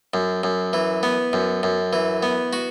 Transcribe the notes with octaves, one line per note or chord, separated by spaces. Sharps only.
F#2
F#2
E3
B3
F#2
F#2
E3
B3
F#4